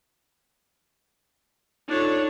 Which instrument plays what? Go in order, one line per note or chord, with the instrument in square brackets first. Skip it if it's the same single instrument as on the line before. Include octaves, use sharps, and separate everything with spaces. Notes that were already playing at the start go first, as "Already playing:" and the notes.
[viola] D4 C#5 [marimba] D#4 F4 A4